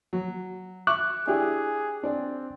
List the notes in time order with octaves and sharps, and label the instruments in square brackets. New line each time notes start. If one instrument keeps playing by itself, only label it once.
[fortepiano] F#3
[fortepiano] E5 C#6 [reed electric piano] D6 F#6
[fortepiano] D4 E4 G4 [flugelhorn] G#4
[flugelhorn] C4 [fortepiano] D4 D5